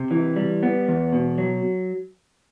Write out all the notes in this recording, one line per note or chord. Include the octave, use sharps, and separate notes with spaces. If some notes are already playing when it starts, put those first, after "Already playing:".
Already playing: C3
E3
G3
B3
E2
B2
F#3